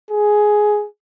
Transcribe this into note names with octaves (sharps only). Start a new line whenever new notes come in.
G#4